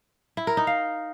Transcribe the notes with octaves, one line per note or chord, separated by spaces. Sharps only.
E4
A#4
D#4
F5